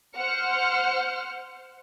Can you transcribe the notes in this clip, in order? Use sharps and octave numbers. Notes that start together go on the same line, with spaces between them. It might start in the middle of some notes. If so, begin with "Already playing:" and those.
C5 F#5 F6 C#7